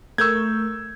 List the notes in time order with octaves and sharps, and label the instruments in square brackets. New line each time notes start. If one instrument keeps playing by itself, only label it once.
[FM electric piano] A3 A#4 C#6 [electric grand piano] E6 G6 G#6